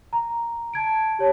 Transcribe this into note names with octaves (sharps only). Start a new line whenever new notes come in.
A#5
A5 G#6 D7
G4 C#5 A5